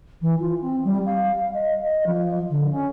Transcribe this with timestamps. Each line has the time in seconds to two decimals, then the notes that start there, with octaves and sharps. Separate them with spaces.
0.21 E3
0.40 F4
0.61 C4
0.84 G3
1.05 F5
1.53 D#5
1.82 D#5
2.06 F3
2.49 D3
2.70 C#4